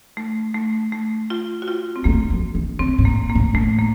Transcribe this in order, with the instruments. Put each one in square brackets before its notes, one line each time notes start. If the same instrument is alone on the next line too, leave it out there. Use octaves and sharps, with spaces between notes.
[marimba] A3
A3
A3
F4
F#4
F4
C4
[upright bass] A3 [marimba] A#3
[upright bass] F3
D#3
[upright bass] C#3 [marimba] C4
[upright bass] A2
[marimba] A#3
A#3
[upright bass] A2
[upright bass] A2 [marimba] A3
[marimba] A#3